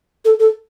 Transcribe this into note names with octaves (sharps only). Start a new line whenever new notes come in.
A4
A4